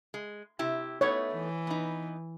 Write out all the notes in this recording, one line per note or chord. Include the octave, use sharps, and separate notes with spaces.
G#3
C3 E4 G4
A3 B3 D#4 C#5
E3
B3 D#4